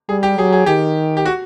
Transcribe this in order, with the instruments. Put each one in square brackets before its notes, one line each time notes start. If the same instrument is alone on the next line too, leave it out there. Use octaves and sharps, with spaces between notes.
[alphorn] G3 [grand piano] G#4
[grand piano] G4
[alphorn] F#3 [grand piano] G#4
[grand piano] G#4
[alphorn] D#3 [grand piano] G4
[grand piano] G4
F#4